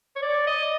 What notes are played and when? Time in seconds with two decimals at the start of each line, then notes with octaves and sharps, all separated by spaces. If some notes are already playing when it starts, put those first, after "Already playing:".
0.16 C#5
0.22 D5
0.47 D#5